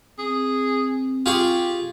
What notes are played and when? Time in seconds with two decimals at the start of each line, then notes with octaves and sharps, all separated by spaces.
0.19 C4 G#4
1.26 F4 G4 G#4 C#6